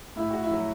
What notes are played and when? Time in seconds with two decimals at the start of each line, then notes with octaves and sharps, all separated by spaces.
0.16 A2 E4
0.31 F#4
0.44 E4
0.51 F#3